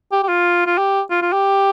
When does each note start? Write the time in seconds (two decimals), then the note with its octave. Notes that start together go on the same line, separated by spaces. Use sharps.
0.12 G4
0.23 G4
0.29 F4
0.66 F4
0.78 G4
1.10 F4
1.22 F4
1.32 G4